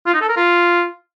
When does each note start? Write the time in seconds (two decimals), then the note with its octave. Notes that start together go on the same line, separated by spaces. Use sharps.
0.06 F4
0.14 D#4
0.21 A4
0.29 A#4
0.37 F4